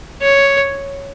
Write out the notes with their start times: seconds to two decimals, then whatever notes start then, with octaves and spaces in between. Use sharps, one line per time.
0.22 C#5